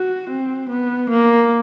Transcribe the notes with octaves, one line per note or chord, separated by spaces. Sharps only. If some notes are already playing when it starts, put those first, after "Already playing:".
Already playing: F#4
C4
B3
A#3